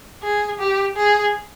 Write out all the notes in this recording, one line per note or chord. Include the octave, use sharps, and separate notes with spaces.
G#4
G4
G#4